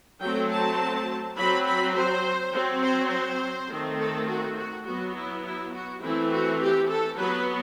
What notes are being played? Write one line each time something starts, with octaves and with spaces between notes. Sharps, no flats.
F#3 A3 C4 G5
A5
F#3 C4 B5
B5
C5
F#3 C4
C5
C5
D#3 A3 C4
A4
F#4
F#4
F#3 B3 F#4
E4
E4
F#4
E3 A3 C4 E4
F#4
G4
A4
F#3 B3 B4